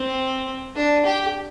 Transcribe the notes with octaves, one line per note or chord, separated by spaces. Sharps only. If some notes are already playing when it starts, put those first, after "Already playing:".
Already playing: C4
D4
G4